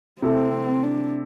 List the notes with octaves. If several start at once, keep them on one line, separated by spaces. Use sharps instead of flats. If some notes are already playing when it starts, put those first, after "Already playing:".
C3 A3 C4 E4 A4
D4